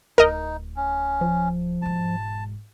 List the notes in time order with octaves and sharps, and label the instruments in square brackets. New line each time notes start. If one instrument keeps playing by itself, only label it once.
[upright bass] D1 [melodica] D#4 [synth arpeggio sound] A#4 D#5
[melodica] C#4
[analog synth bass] F3
[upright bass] E1 G#2 [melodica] A5